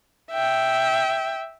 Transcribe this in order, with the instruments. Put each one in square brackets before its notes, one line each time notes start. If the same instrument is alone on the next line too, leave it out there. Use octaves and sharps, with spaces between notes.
[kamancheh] E5 G5